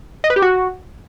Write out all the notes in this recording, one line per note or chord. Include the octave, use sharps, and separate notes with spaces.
D#5
B4
G4
F#4